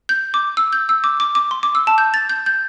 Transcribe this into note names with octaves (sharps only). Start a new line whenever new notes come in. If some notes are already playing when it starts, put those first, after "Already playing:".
G6
D6
E6
G6
E6
D6
D6
D6
C6
D6
E6
A5
G6
A6
G6
G6